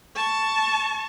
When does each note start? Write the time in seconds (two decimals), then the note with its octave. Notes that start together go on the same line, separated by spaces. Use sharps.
0.16 A5 C#6